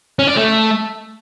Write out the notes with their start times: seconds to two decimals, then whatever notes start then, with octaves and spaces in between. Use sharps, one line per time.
0.19 C#4
0.28 D5
0.36 A3